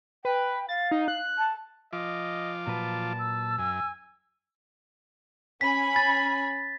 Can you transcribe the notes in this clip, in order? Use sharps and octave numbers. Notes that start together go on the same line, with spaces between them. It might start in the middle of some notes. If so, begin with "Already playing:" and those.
B4 G5
F5 A6
D#4
F#6
A5
F3 F4 D#5 D6
A#2 F#3 B4 A5
E6
F#2 G#5
C#4 G#5 B5 B6
A6